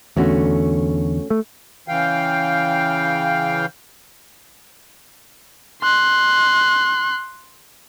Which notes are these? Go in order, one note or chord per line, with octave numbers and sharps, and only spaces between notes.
E2 D3 A3 C#4 F#4
A3
C#3 E3 F5 G5
C6 F#6